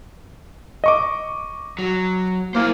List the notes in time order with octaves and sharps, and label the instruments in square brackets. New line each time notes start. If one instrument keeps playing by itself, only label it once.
[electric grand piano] D#5 C#6 D6
[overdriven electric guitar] F#3
[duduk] A#3 [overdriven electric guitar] E4 C5